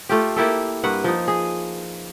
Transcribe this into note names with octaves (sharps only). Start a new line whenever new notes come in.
A3 F4 G4
A#3 E4 G4 A4
G2 A#3 B4 F#5
F3 D#4
G#4